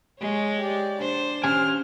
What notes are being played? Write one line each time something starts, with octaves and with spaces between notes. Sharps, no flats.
G#3 C#5
G4 D5
D4 C5
C#4 G4 G#5 F6